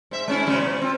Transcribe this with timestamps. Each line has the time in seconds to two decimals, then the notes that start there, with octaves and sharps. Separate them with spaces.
0.11 G#2 E5
0.28 G#3 C#4 E4
0.46 G#2 C#3 F#3
0.60 B2
0.81 C4 F4